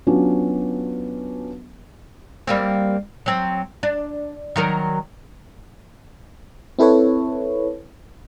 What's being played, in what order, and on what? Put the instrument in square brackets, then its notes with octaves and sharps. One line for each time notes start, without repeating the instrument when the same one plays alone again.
[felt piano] F#3 B3 C#4 D4 F4 F#4
[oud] G3 A#3 C4
F#3 C4
D4
D#3 F#3 A#4
[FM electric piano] C4 E4 A4 B4 C#5